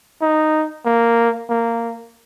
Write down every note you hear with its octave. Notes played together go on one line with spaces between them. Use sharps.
D#4
A#3
A#3